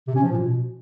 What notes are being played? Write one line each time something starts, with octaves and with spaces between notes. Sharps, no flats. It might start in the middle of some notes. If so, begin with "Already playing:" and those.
C3
C#4
F3
A#2
B2